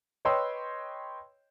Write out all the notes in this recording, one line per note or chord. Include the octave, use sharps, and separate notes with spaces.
B4 C#5 D#5 G5 C6 E6